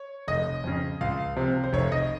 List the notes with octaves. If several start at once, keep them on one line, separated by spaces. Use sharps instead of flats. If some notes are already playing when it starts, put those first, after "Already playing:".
Already playing: C#5
F1 D#5
F2 C#3
C#2 F5
C3 F3
C5
F1 C#5
D#5